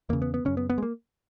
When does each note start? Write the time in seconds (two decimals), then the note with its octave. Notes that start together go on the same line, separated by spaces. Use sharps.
0.09 E2 C#3 A#3
0.22 B3
0.34 B3
0.45 F#2 C#3 C#4
0.57 B3
0.70 B3
0.78 G#3
0.83 A#3